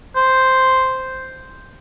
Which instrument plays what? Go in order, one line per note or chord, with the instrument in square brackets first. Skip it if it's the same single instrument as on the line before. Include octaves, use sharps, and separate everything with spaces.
[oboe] C5